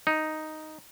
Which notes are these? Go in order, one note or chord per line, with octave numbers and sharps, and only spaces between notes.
D#4